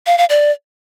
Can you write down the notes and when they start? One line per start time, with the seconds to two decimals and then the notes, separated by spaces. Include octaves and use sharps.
0.06 F5
0.18 F5
0.29 D5